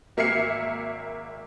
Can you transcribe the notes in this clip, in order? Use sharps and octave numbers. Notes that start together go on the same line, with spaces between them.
G#1 A#3 E5 F6 C7 C#7